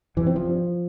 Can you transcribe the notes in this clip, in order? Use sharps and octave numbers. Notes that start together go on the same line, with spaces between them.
F2 C3 E3
C4
F3
G2